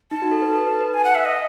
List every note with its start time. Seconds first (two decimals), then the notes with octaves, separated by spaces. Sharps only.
0.11 D#4 A5
0.22 F#4
0.31 A4
0.42 B4
0.53 A4
0.66 B4
0.81 B4
0.94 G#5
1.04 F#5
1.15 E5
1.25 D#5